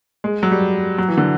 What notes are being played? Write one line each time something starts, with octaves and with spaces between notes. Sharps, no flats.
G#3
F#3
G3
F#3
E3
D3